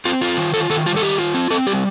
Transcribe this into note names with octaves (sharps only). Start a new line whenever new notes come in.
C4 F4
F4
D#3
F4 A4
D#3 A4
G3 F4
A4
D#3 G4
F4
C4
C4 A4
G3 G4